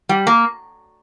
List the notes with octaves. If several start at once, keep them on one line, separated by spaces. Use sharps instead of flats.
G3
A#3